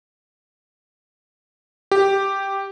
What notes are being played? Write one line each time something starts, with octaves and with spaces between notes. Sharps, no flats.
G4